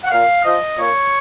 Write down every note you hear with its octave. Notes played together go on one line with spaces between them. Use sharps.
F#5
A#2 F5
F3 D#5
A#2 C#5